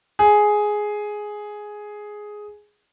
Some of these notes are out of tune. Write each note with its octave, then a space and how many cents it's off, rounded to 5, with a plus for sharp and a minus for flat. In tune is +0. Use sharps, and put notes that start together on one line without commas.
G#4 +5